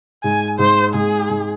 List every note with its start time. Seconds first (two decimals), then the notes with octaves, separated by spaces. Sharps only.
0.24 G#2 G#5
0.59 G#2 C5
0.94 G#2 G#4
1.30 G#2